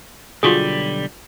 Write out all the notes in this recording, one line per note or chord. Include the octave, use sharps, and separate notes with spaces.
B1 D3 G3 F4 F#4 G#4